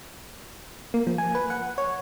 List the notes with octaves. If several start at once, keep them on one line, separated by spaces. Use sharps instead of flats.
A#3
F3
G#5
B4
F#5
C#5